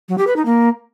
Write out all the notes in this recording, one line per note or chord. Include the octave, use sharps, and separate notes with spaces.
F#3
G4
B4
D#4
A#3